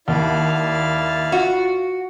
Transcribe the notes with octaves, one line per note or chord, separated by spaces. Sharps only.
D#2 E4 D5 F5 F#5
F4 F#4